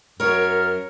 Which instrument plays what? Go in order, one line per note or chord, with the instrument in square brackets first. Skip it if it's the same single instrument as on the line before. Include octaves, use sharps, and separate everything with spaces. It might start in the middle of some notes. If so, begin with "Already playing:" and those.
[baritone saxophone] F#2 [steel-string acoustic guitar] A#4 C#5 [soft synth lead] F6